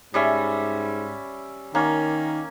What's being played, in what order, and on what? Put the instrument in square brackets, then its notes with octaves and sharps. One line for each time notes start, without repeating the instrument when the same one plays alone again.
[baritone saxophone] G#2 [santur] G3 C#4 E5
[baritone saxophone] D#3 [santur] A#3 C#4